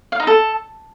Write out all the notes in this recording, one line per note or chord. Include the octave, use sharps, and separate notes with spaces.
F5
D#4
A4